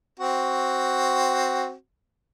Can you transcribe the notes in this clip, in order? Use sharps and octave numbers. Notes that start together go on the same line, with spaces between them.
C4 F#4